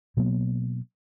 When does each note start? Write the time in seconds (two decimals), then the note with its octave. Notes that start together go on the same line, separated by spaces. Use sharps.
0.17 B2 F#3 A#3 B3